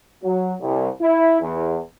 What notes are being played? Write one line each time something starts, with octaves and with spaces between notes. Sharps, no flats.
F#3
C2
E4
E2